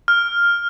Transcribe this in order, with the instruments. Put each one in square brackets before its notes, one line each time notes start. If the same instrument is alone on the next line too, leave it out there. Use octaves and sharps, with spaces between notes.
[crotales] F6